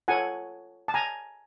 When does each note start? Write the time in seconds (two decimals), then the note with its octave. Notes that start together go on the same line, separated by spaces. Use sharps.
0.08 F4 A4 C#5 F#5 G#5
0.88 A5
0.94 G#5 A#5